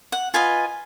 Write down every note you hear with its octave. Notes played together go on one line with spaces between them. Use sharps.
F#5
F4 B4 D#5 G#5